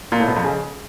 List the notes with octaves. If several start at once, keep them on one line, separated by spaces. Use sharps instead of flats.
A#2
A2
B2
F2
C#3